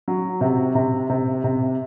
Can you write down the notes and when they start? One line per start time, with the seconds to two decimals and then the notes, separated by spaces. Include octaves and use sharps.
0.08 F#3
0.41 C3
0.75 C3
1.10 C3
1.44 C3